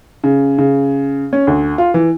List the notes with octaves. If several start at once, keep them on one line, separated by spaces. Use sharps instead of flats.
C#3
C#3
C#4
D2
F4
E3